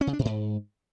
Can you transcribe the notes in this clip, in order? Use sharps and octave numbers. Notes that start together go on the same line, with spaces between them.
C#4
C#3
D4
B2
G#2